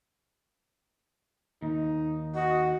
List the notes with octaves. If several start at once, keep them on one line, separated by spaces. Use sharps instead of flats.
D#2 D#4
F#4 D#5